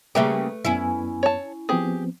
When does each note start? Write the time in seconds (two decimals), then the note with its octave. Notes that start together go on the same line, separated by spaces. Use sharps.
0.15 C#3 G3 A3 A#3 G4 B4 E5
0.65 F#2 B3 C#4 E4 G#5
1.23 C#5 A5
1.69 F3 B3 C4 G4 G#4